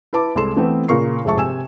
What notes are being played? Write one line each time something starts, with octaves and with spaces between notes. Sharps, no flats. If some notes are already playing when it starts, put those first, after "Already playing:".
E4 B4 A5 D6
C2 G#3 A4 C6 E7
E3 A3 B3 C4
A#2 C#3 A#4 C#6 C7
F1 G#3 G#4 E5 A5 C#6
C3 G#5 E6 E7